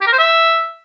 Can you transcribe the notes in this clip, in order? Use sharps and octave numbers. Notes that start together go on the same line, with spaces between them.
G4
A#4
C5
E5